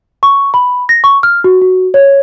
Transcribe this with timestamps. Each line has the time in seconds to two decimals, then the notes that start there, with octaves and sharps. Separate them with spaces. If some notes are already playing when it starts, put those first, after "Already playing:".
0.23 C#6
0.54 B5
0.89 A#6
1.04 C#6
1.23 F6
1.44 F#4
1.61 F#4
1.94 C#5